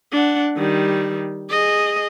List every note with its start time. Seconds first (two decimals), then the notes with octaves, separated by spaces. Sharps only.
0.12 D4 F#5
0.57 D#3 G3
1.50 G#4 D#5